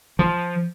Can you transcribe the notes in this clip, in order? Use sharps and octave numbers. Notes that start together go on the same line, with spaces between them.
F3